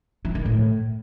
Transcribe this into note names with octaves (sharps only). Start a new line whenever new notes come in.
E3
D#3
A2